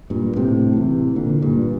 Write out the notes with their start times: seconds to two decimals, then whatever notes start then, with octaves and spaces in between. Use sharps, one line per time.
0.10 G2 A#2
0.36 A2 C3
0.76 C3 E3
1.16 A#2 D3
1.42 G2 A#2